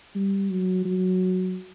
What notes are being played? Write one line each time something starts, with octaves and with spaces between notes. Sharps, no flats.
G3
F#3
F#3